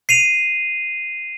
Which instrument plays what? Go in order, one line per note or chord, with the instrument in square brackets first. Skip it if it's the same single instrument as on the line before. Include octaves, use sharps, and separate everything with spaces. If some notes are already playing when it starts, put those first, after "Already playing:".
[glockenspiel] C7 D#7 F7